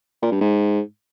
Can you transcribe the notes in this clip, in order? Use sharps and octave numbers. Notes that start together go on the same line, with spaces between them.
A#2
G2
G#2